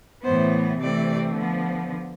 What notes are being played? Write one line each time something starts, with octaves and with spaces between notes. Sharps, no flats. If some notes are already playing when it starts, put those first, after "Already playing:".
A2 E3 B3 C5
C3 E3 A3 C4 D5
D3 F3 B3